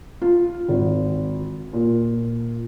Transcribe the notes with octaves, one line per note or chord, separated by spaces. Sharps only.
F4
G#1
A#2